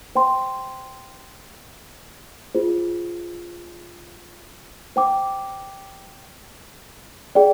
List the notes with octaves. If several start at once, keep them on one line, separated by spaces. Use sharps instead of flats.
C5 G5 C6
F4 G#4 C5
C5 G5 D6
G#4 D5 G5